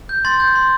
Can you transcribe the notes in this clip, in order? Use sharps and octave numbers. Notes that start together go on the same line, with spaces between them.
G6
C6 A6
G6
C6